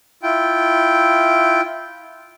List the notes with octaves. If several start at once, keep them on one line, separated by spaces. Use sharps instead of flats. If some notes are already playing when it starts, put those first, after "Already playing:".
E4 F4 G5